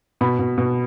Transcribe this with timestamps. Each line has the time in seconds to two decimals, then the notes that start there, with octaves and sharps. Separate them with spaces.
0.21 B2 B5
0.39 B2
0.58 B2